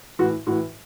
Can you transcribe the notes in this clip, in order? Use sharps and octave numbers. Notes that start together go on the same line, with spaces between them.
A2 E3 F#4
A2 E3 F#4